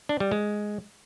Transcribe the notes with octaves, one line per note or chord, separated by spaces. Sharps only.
D4
G3
G#3